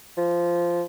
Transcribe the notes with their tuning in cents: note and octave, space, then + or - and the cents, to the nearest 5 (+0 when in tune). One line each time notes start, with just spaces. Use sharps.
F3 -10